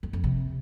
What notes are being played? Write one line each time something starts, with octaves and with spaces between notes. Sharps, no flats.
F2
F2
C3